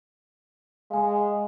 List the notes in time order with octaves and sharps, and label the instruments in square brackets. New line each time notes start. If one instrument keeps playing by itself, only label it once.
[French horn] G#3 [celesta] F5 G#5